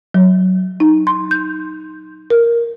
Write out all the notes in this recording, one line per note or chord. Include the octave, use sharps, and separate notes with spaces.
F#3
D#4
C6
G6
A#4